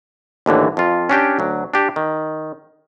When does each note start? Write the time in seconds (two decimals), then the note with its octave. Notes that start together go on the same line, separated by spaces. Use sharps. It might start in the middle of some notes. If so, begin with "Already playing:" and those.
0.46 D#2 A2 D3 E3
0.77 F2 F4
1.09 C#4 D4 G4 G5
1.39 D2 F#3
1.74 D4 G4
1.96 D#3